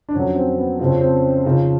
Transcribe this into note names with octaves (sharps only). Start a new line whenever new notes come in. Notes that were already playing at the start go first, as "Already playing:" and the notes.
D4
F2 D3 F#3 C#4
C4
B3
F2 C#3 F3 C4
C#4
C4
F2 C#3 F3 D#4